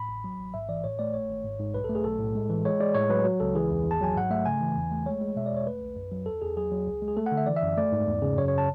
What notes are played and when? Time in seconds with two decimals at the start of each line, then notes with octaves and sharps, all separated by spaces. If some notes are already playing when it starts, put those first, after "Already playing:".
Already playing: A2 B5
0.09 A1
0.24 F#3
0.40 A1
0.54 G#2 E5
0.69 E3 D5
0.84 A2 C#5
0.99 A3 D5
1.14 G#1 C#5
1.30 G#1
1.44 G#2
1.59 G#2
1.74 B1 B4
1.84 A4
1.89 A3
1.95 G#4
2.04 B1 A4
2.19 A2
2.35 G#3
2.49 E3
2.65 G#3 C#5
2.80 G#3 D5
2.95 A2 C#5
3.10 F#3 B4
3.25 F#3
3.40 C#2 A4
3.55 E3 G#4
3.70 E2
3.85 G#1
3.91 A5
4.01 F#3 G#5
4.16 G#2 F#5
4.30 A3 E5
4.46 C#3 G#5
4.61 E3
4.76 E2
4.91 A3
5.06 G#3 C#5
5.21 G#3
5.36 B2 E5
5.46 D5
5.51 E2
5.57 C#5
5.67 A3 B4
5.82 B1
5.96 F#2
6.12 F#3
6.26 E2 A4
6.42 E2 G#4
6.57 F#3 G#4
6.72 F#3
6.87 C#2
7.02 G#3
7.08 G#4
7.17 A3 A4
7.26 F#5
7.32 D3
7.37 E5
7.46 E3 D5
7.56 E5
7.62 F#2
7.77 A3 D5
7.92 G#2
8.07 E2
8.22 C#3
8.37 F#2 C#5
8.48 C#5
8.58 A5